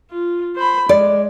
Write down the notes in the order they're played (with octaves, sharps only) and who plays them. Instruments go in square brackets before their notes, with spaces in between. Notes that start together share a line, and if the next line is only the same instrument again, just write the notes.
[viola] F4
C5 B5
[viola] G#3 [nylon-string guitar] D5